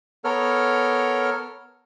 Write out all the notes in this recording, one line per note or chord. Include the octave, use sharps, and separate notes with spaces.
B3 A4 A#4 C#5 F6